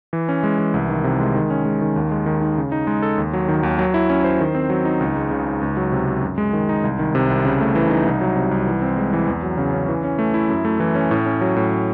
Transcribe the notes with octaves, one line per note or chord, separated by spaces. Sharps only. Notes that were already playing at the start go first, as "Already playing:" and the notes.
E3
C#4
G#3
E3
C2
D#3
C3
G#3
D#3
C#4
G#3
D#3
D#2
G#3
D#3
D#4
C#3
D#4
G#3
A4
D#2
F#3
D#3
D#2
F#3
E4
C#4
C5
D#3
C4
F#3
D#4
C#2
G#3
C#3
D#4
C#2
F#3
C3
C4
F#2
G#3
D#3
D#4
C2
D#3
C3
C2
C#3
A3
E3
D#4
C2
F#3
C3
C2
E3
C4
G#3
E3
E2
F#3
C#3
C#4
E3
C#4
A3
E4
F#2
A3
E3
C#4
A2
C#4
F#3
A2